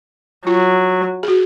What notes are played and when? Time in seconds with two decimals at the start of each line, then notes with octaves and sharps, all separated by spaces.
0.47 F#3 F4
1.23 G#4
1.28 F#4